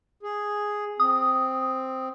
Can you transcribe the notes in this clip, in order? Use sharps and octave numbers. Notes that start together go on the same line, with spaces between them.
G#4
C4 D#6